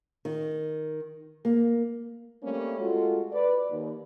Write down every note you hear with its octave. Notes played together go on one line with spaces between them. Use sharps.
D#3
A#3
G3 A3 A#3 C4 C#4
G#3 F4 F#4 A4
B4 D5
D#2